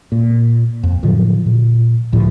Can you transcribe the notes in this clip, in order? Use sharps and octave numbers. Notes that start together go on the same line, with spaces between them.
A#2
F2
A2 D3 F3 F#3
A#2
C#2 A2 D3 F3